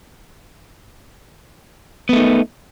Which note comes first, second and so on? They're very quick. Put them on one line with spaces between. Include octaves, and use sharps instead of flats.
B3 A3 D#4